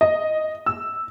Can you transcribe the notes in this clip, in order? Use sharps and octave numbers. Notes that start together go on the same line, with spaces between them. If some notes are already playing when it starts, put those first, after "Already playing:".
D#5
E6